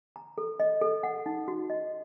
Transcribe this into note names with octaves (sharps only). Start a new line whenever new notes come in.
A#5
A4
D#5
A4
F#5
D#4
F#4
D#5